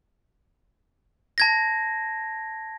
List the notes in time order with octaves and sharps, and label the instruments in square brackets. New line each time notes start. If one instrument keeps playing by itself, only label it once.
[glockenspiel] A5 G#6 A#6